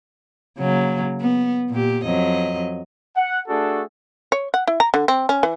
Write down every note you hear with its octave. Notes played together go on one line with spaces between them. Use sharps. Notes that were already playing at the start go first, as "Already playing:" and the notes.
C#3 F#3 A#3
B3
A#2 G4
F2 F#3 D#5
F#5
A3 D4 F#4 G#4 A4
C#5
F#5
E4
A#5
D3
C4
C#4
E3